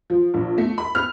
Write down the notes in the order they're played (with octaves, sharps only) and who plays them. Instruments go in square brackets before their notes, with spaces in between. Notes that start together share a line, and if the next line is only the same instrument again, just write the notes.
[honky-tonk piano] F3
A#1
A3
B5
F6